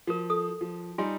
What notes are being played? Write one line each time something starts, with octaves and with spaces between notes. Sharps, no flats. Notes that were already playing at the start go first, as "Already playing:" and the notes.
F3 F#4 A#4
A4 D#6
F3
G3 D#4 F4 G#5 C6